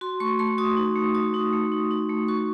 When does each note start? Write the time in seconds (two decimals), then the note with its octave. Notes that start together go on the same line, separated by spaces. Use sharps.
0.01 F#4 C6
0.20 A3 C#6
0.39 A3 C6
0.58 F#4 D#6
0.77 D#4
0.96 A3
1.15 F#4 D#6
1.34 D#4
1.53 A3
1.72 D#4
1.91 D#4
2.09 A3
2.28 F#4 C#6